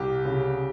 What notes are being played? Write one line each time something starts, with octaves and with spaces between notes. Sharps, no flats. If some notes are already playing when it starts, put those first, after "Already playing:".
Already playing: C2 G4
C#3